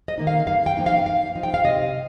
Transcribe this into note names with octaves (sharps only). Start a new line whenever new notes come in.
D#5
D#3 A#3 D#4
F5
G2 F5
G5
F3 A#3 D#4
F5
G5
G2 F5
F3 D#4
G5
F5
C3 D#5